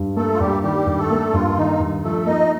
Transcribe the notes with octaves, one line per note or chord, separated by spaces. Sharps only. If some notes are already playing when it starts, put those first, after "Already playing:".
Already playing: G2
A3 A#3 A4
F4
G2 G3 G4
D#3 G3 G4
G2
A3 A4
A#3
G2 F4
D#3 D#4
G2
F3 A3 A4
A#3 D#4 D#5